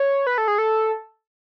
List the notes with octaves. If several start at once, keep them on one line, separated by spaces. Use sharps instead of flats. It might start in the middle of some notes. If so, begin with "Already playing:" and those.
Already playing: C#5
B4
A4
G#4
A4